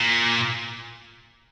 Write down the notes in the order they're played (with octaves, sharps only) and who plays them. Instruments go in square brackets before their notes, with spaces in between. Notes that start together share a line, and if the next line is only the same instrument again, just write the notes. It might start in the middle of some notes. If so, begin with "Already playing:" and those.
Already playing: [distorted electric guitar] A#2